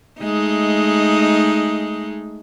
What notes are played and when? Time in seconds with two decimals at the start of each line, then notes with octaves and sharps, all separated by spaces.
0.20 G#3 A3 D#4